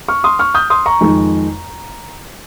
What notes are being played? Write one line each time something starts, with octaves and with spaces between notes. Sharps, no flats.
C#6 F6
C6 D#6
C#6 F6
D#6 G6
C6 D#6
A#5 C#6
F2 D#3 G#3 D#4